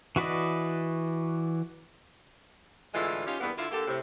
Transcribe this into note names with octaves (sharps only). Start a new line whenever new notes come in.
E3 F#4 B4 D5 D#5
A2 D3 E3 G#3 F4
C#4 D#4 F4 G4
E2 G2 A#3 B3
D3 E4 F4
D3 A#3 G4 A4
A2 C3